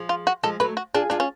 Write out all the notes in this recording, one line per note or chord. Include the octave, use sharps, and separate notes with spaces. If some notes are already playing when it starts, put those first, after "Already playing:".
Already playing: F3 G#3
F4
F#4
F3 G#3 A4
F#3 A3 B4
F#4
D4 F4 G#4
D4 F4 G#4
C#4